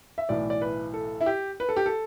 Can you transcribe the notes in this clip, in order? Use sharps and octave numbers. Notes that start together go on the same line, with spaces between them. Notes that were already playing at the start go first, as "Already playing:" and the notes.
E5
B1 A2 E3 D5
D5
B4
A4
E4
G4
B4
A4
G4
A4